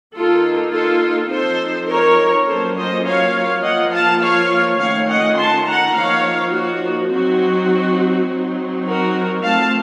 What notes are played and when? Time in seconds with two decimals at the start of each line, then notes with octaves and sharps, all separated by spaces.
0.16 D#3 A#3 D#4 F4 A4
0.74 F4 A4
1.31 F3 C4 D#4 A4 C5
1.90 A#4 C#5
2.47 F#3 A#3 C#4 F4 A4 C5
2.76 C5 D#5
3.06 C#5 F5
3.63 F3 A#3 F4 D#5 F#5
3.92 F5 A5
4.22 C#5 F5
4.80 D#3 A3 C#4 F4 C#5 F5
5.09 D#5 F#5
5.38 A5 C6
5.67 F#5 A#5
5.95 F3 A#3 D#4 C#5 F5
6.54 F#4
7.12 F#3 C4 D#4 F#4
8.27 F#3 C4 D#4
8.86 F#4 A#4
9.44 F3 A3 C4 F5 A5